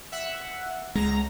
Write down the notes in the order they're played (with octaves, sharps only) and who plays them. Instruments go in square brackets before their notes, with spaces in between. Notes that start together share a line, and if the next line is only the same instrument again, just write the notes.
[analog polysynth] E5 F#5
[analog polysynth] C#2 A#5 [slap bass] G#3